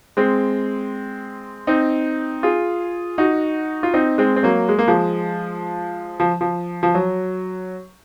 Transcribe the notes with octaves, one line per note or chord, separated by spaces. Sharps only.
G#3 C4
C4 D#4
F4 G#4
D#4 F#4
F4
C4 D#4
G#3 C4
C4
F#3 A#3
G#3
A#3
F3 G#3
F3
F3
F3
F#3